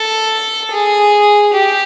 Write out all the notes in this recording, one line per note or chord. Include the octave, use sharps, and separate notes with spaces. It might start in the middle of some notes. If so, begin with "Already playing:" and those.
Already playing: A4
G#4
G4